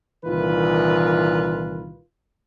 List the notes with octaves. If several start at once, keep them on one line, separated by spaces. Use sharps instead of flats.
C2 A#2 D#3 E3 F4 B4